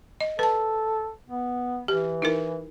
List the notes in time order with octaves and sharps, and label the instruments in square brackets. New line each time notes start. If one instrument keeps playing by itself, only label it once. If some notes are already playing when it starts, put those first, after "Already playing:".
[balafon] D#5
[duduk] A4 [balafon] B4 A5
[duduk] B3
[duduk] E3 [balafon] G4
[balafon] D#4 E4 A#4